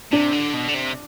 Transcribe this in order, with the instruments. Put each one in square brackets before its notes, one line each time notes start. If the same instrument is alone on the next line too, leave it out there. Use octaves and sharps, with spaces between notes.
[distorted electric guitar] C3 [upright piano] D4
[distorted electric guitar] D3
B2
D3
C3